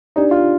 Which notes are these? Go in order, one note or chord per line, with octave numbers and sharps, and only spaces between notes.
D4 D#4 G4 D5
F4